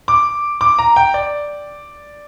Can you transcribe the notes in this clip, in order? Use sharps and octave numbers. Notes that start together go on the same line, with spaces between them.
D6
D6
A#5
G5
D5